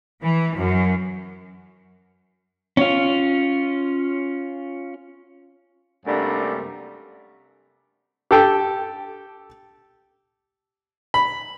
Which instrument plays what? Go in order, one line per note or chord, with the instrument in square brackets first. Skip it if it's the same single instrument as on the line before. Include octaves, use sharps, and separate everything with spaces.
[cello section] E3
F#2
[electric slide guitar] C#4 F4
[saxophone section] F#2 C3 G3 A3 A#3 D4
[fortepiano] G4 A4 G5
B5